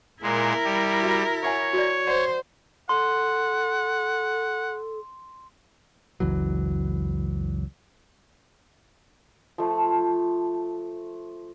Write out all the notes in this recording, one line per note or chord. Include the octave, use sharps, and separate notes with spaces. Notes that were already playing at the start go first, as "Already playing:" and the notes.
A#2 G#3 E4 A#4
G3
F#4 E5
C#5 E5 F#5 G#5
F#4 D5
C5 D5 F#5
A4 F#5 C6
F#1 C#2 E3 F#3
F3 A3